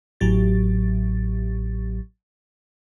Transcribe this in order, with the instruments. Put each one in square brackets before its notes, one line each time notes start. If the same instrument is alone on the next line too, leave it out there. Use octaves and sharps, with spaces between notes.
[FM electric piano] A1 A2 F#3 G4 A6